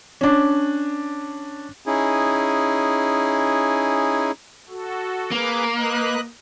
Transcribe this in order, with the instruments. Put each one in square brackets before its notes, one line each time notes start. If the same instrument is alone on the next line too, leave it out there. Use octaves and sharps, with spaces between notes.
[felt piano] C#4 D4
[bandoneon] C#4 D#4 E4 G#4
[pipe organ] F#4 A4
[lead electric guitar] A#3 [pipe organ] G#4 B4 D6
[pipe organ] B4 D#5 F#6